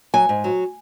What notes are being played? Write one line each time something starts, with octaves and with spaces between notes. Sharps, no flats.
F#3 G#5
G#2
F#3